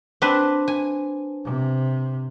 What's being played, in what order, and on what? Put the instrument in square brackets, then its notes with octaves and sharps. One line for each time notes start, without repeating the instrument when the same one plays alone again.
[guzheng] C4 D4 B4
G#5
[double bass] C3